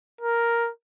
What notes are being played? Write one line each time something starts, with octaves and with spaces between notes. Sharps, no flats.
A#4